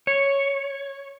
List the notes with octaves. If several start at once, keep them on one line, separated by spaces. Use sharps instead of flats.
C#5